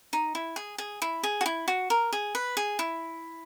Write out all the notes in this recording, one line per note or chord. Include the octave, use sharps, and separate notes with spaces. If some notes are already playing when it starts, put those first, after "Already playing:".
D#4
E4
G#4
G#4
E4
G#4
F#4
E4
F#4
A#4
G#4
B4
G#4
E4